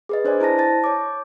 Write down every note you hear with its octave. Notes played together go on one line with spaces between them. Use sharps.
G#4 B4 D#5
D4 C5 D5 G#5
E4 C5 A5 A#6
A5 A6
C#5 D6